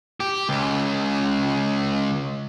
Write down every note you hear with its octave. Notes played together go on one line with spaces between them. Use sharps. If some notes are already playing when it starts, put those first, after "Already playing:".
G4
C#2